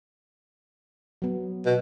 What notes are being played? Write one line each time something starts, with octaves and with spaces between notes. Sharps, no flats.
F#3 B3
B2